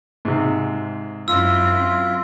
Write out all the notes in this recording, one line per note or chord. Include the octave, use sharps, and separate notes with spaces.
G#2 C3
F#2 C4 E4 F4 E6